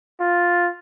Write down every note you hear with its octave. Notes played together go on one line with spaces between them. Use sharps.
F4